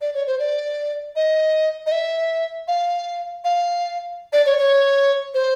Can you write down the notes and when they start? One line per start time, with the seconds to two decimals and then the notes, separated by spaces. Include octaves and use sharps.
0.01 D5
0.14 C#5
0.27 C5
0.39 D5
1.16 D#5
1.86 D#5
1.92 E5
2.68 F5
3.44 F5
4.33 D5
4.46 C#5
4.58 C#5
5.34 C5